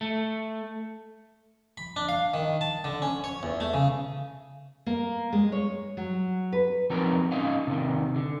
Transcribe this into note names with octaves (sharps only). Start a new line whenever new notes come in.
A3
B5
D4
F5
D#3
A5
D3
C#4
C#5
E2
A3
C#3
A#3
G#3
C#5
F#3
B4
F3 F#3 C4 D#4 A#4 A#5
C#4 D#4 D#5 F5
C3 D#3
D3